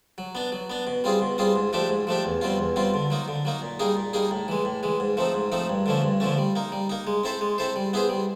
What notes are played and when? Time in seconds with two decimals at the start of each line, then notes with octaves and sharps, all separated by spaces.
0.18 F#3
0.35 B3 D4
0.52 F#3
0.70 B3 D4
0.87 B2
1.04 G3 C4 F4 G#4
1.21 B2
1.38 G3 C4 F4 G#4
1.56 G#2
1.73 F3 A3 D4 G4
1.89 G#2
2.07 F3 A3 D4 G4
2.25 E2
2.41 B2 G3 C4 F4
2.59 E2
2.76 B2 G3 C4 F4
2.94 D3
3.10 F#3 A#3 D#4
3.28 D3
3.45 F#3 A#3 D#4
3.62 A#2
3.79 G3 A#3 D#4 G#4
3.97 A#2
4.13 G3 A#3 D#4 G#4
4.31 A2
4.48 E3 G#3
4.65 A2
4.83 E3 G#3
5.00 G#2
5.17 F3 A3 C4 D#4
5.34 G#2
5.52 F3 A3 C4 D#4
5.69 G2
5.86 D3 F3 A3 C#4
6.04 G2
6.20 D3 F3 A3 C#4
6.37 G3
6.56 A#3 D#4
6.72 G3
6.89 A#3 D#4
7.07 G#3
7.24 C4 E4 A4 C5
7.41 G#3
7.58 C4 E4 A4 C5
7.76 G3
7.93 B3 E4 G#4 C5
8.09 G3